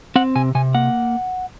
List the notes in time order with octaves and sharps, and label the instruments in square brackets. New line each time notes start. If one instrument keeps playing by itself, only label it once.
[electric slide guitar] C4 F#5
C3 G#5
C3 G#5
A#3 F#5